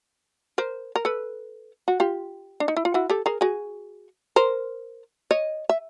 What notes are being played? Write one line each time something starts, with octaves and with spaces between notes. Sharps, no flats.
A#4 C5
A#4
A4 B4
F#4
F4 G4
D4
D#4
E4
F4
E4 F#4
G4 A4
G#4 A#4
F#4 G#4
A#4 C5
C#5 D#5
E5